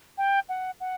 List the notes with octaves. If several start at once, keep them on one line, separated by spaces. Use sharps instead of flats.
G5
F#5
F#5